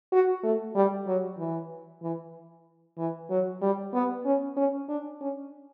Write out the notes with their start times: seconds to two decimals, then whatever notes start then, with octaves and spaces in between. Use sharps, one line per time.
0.12 F#4
0.43 A3
0.75 G3
1.07 F#3
1.38 E3
2.02 E3
2.98 E3
3.30 F#3
3.62 G3
3.94 B3
4.25 C#4
4.57 C#4
4.89 D4
5.21 C#4